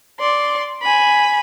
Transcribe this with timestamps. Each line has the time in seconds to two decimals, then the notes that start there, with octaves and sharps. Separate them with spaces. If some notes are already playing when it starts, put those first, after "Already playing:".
0.20 D5 C6
0.83 G#5 B5